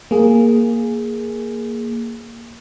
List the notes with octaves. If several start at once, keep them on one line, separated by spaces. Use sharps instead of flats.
A#3 G#4